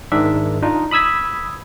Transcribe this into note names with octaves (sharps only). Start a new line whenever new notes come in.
G#2 D#3 G#3 D4 A#4 E5
D4 D#4 F4
B5 D#6 E6 G#6 B6